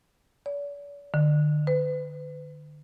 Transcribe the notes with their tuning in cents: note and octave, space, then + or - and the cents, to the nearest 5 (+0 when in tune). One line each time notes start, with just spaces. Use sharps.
D5 -45
D3 +35
B4 +35